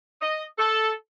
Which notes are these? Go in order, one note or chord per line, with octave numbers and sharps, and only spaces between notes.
D#5
A4